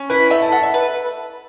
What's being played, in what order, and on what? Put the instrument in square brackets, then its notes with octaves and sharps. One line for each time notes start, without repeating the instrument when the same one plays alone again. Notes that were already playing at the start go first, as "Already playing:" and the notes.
Already playing: [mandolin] C#4
[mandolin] E4 [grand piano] B4
[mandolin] A3 [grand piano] E5
[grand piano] A5
[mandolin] A4 [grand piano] F#5
[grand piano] E5
[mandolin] B4